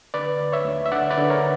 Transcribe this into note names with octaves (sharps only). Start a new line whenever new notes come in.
D3 B4 D5
D2
C#5 E5
D2
E5
D3 D5 F#5
B4 D5
D3
A#4 C#5